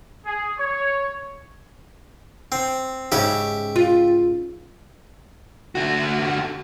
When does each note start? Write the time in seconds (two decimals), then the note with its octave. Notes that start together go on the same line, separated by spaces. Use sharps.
0.25 G#4
0.59 C#5
2.52 C4
3.12 G#2 C#3 C#4 G4 E5
3.76 F4
5.75 D3 F#4